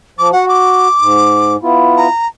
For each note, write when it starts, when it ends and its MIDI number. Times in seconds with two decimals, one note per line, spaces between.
0.19 0.31 53
0.19 0.31 86
0.33 0.88 66
0.33 0.48 78
0.49 1.55 86
1.00 1.57 44
1.63 2.07 59
1.63 2.07 64
1.63 2.07 65
1.97 2.27 82